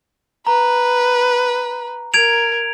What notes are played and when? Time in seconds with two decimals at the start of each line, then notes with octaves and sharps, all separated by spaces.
0.47 B4 A#5
2.14 A#4 G#6 D7 F7